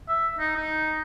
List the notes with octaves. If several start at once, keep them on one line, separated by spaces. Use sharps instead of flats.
E5
D#4
D#4